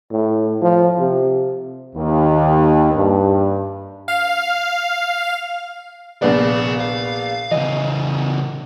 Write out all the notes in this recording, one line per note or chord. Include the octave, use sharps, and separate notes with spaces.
A2
F3
C3
D#2
G2
F5
A#1 B3 D4 G#4 F5
F5
C#3 E3 D#5